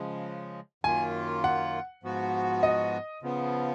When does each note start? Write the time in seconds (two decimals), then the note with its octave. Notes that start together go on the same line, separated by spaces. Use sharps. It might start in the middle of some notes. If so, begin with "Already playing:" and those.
Already playing: C#3 F3 G#3
0.84 F#2 D#3 A#3 F4 G#5
1.44 F#5
2.03 G#2 F3 B3 F#4
2.63 D#5
3.22 C#3 F3 B3